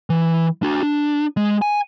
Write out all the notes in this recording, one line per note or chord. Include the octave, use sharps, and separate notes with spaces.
E3
D4 F#4
D4
G#3
G#5